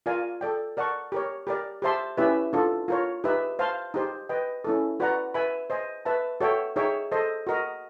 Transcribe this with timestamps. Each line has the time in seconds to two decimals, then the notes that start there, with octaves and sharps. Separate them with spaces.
0.06 F4 A#4 D5 F5 G#5
0.41 A4 D5 G5
0.77 A#4 D5 F#5 A5 C#6
1.12 G4 A#4 C#5
1.47 G4 A#4 D5
1.82 G4 C5 E5 A5 C6
2.17 C#4 E4 G4 B4 E5
2.53 D4 F4 A4
2.88 F4 A#4 C#5
3.24 D#4 G4 B4 E5
3.59 C5 F5 A5 C6
3.94 D#4 G4 C5
4.29 B4 D#5 G5
4.64 C#4 E4 A4
5.00 F#4 B4 D5 F#5 A#5
5.34 B4 E5 G#5 B5
5.70 C5 D#5 G#5
6.05 B4 E5 A5
6.40 F#4 A4 C#5 E5 G5
6.76 D#4 G#4 C#5 E5 G5
7.12 A4 C5 D#5
7.47 F#4 A#4 D#5